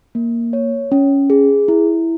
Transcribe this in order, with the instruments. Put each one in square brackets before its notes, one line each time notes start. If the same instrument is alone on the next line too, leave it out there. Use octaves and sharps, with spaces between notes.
[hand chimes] A#3
C#5
C#4
G#4
E4